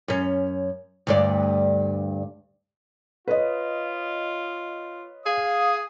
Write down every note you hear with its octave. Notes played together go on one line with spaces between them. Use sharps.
F#2 C#4
D2 G2 D5
F4 B4 C#5 D#5
G#4 F5 D#6